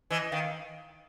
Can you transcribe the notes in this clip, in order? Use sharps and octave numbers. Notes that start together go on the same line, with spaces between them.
E3 D#5
D#3 F5